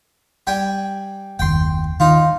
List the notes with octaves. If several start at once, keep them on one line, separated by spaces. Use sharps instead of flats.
G3 G5 G#5
F#1 D#2 G5 C6
D#3 D#4 F4